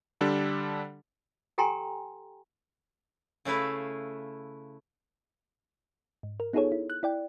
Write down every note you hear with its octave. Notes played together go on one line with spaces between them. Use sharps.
D3 G3 D4 A4
G4 A4 G5 G#5 A#5 C6
C#3 A3 E4 B4 F5
G#2
A#4
B3 D#4 F4 G#4 A4 C#5
E4
F#6
E4 D5 G5